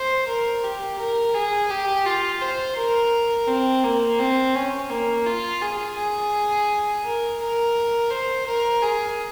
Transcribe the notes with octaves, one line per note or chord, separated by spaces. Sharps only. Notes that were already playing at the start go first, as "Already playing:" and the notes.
Already playing: C5
A#4
G4
A#4
G#4
G4
F4
C5
A#4
C4
A#3
C4
C#4
A#3
F4
G#4
G#4
A#4
A#4
C5
A#4
G#4